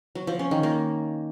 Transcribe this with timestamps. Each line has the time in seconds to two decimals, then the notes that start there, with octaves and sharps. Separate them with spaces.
0.15 F#3
0.27 F3
0.39 C#4
0.51 D#3
0.63 A#3